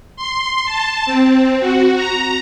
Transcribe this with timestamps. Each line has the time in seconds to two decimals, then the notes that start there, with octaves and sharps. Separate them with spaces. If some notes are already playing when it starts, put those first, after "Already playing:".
0.16 C6
0.66 A5
1.06 C4
1.60 F#4
1.96 A#5